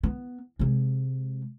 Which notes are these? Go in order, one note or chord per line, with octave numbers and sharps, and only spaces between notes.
B3
C3 G#3